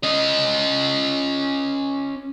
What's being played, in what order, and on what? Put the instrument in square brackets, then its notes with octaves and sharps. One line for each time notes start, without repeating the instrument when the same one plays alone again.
[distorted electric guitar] C#4 D#5